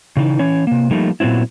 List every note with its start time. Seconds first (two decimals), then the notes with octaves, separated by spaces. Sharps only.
0.17 C#3 E3 D#4
0.39 E3 C#4 C#5
0.67 C3 A#3
0.91 F3 G3 A3 A#3 D#4
1.20 A#2 F#3 B3 C4 E4